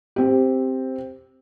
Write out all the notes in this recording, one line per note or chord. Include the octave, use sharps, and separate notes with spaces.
C4 G4